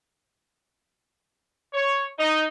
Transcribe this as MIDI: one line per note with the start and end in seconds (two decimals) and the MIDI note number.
1.74 2.04 73
2.19 2.44 63